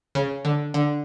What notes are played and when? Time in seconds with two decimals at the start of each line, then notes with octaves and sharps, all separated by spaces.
0.15 C#3
0.45 D3
0.74 D3